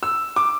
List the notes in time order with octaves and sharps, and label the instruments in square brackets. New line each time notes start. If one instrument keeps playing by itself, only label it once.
[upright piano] E6
D6